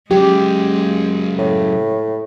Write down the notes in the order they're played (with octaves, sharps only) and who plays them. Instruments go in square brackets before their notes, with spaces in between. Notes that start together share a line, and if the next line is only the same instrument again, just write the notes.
[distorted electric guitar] C#3 F#3 [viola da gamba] G#3 [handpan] G4
[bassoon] A2